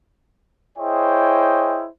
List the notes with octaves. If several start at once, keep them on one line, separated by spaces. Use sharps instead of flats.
E4 G#4 C5 C#5 D#5 G5